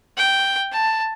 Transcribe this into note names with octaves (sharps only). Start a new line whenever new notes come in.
G5
A5